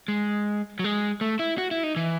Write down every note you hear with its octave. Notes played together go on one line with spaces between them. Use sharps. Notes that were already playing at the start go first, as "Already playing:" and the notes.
G#3
F#3
G#3
A3
E4
F#4
E4
D#4
E3